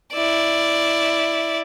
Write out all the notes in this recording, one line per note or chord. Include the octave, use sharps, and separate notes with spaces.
E4 D5